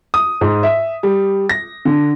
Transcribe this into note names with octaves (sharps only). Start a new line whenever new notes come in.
D#6
G#2
E5
G3
A#6
D3